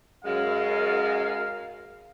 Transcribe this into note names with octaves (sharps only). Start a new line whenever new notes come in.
F#2 G#3 A#4 F5